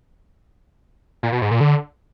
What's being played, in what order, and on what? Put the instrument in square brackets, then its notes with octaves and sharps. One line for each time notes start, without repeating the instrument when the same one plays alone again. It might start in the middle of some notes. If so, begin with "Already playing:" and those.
[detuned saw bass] A#2
B2
G#2
A#2
D3